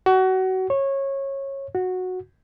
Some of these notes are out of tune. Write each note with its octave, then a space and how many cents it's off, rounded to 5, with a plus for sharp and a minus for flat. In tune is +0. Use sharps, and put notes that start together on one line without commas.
F#4 +25
C#5 -20
F#4 -10